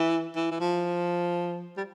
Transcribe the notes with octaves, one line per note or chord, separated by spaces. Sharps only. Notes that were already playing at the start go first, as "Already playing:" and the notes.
Already playing: E3
E3
E3
F3
G3